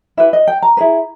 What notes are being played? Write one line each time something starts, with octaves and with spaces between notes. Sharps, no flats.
E4 G4 B4 E5
D#5
G5
A#5
E4 G#4 B4